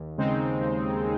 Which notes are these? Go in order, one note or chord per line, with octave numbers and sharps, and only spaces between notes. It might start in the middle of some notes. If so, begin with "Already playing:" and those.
Already playing: D#2
C#3 G#3 C4 D#4
D#2
C#3